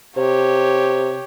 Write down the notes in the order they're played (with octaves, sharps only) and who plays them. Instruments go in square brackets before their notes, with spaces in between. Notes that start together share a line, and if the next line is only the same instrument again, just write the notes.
[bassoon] C3 [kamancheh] G4 C#5